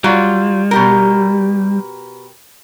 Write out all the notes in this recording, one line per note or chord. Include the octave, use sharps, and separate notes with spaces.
F#3 G3 F4
B2 G4 A#4